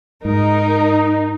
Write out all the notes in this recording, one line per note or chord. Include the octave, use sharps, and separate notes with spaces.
G#2 D#4 A#4